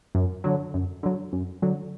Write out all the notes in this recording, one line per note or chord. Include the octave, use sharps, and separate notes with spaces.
F#2
D3 F#3
F#2
D3 F#3
F#2
D3 F#3